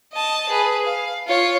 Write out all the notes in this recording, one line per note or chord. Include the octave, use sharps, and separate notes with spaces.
D#5 A5
G#4 B4
F5
F4 C#5